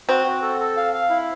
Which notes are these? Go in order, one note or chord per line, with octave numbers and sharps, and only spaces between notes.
C4 F#4
F#4
A4
A4
F5
F5
E4